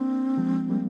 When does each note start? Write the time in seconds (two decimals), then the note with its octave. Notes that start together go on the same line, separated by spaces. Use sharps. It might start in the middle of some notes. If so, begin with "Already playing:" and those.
Already playing: A#3 C4 D4
0.37 F3 G#3
0.70 G3 A#3